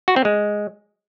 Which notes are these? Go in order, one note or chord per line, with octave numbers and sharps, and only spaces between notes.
F#4
C4
G#3